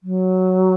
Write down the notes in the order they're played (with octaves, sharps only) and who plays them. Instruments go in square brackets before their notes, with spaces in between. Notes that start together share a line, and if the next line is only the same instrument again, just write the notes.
[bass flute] F#3